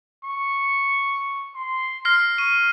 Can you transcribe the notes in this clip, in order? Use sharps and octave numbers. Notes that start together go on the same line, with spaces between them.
C#6
C6
F6 A#6 C7
C#6 D#7